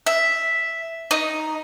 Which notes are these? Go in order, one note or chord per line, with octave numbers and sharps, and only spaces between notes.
E5
D#4